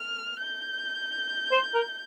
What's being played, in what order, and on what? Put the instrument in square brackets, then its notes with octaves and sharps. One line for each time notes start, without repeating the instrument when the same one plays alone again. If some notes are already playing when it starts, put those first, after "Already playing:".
Already playing: [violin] F6
G6
[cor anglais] C5
A#4